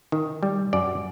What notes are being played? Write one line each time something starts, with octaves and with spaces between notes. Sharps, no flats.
D#3
G3
F#2 D5